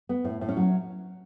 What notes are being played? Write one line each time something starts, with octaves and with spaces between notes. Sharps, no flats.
B3
A2
A2
C#4
F#3